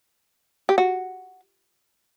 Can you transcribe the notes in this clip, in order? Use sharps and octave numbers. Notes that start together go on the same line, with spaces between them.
G4
F#4